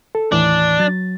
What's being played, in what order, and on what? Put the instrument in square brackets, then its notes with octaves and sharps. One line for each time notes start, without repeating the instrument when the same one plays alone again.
[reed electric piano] A4
[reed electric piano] D#2 A2 E3 [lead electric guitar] D4
[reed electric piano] F#3 A6